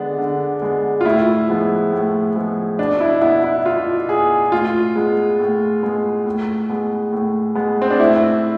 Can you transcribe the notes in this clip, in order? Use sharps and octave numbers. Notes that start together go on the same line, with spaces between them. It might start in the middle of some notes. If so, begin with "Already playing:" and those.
Already playing: D3 G#3 B3 D4
D3
G#3 B3
F4
A2 E4
F3 G#3 B3
A2
F3 G#3 B3
B2 D4
E4
B3 E4
E4
B2 F4
B3 G#4
A2 F4
G#3 B3
A2
G#3 B3
A2
G#3 B3
A2
G#3 B3
C4
D4
A2 E4